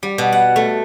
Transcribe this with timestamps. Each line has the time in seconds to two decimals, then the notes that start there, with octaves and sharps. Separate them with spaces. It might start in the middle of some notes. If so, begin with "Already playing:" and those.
0.03 G3
0.18 B2
0.32 F#5
0.56 A3